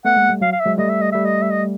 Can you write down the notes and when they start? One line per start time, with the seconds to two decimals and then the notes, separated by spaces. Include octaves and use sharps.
0.05 A3 B3 F#5
0.16 G#3 A#3
0.29 G3 A3
0.41 F#3 F5
0.52 F5
0.60 E5
0.66 F#3 G#3
0.78 G3 A3 D#5
0.89 E5
1.01 D#5
1.12 G3 A3 E5
1.25 D#5
1.42 E5
1.50 D#5